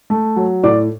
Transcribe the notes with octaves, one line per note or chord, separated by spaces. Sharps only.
A3
F#3
A2 D5 D6